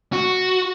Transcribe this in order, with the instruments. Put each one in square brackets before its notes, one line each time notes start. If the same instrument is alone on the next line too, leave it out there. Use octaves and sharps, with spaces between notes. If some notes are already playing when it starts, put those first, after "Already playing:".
[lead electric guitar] F#4